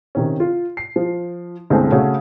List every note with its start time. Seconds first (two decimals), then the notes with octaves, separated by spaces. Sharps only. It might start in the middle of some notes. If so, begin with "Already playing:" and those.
0.15 C3 D#3 C#4
0.40 F4
0.77 C7
0.96 F3
1.70 G1 C2 G#3 A3 C4 G#5
1.92 C#3 A3 C#4 F#4